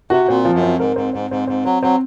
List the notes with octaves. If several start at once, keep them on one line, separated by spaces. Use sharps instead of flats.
C3 F#4
A#2 C4
F3
F#2
C4
G#2 A#4
G#2 C4
G#2 C4
G#2 C4
G#2 C4
F#3 C4
F#3 C4